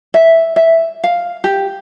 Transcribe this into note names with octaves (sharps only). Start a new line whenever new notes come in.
E5
E5
F5
G4